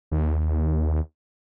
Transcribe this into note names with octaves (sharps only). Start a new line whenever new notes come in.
D#2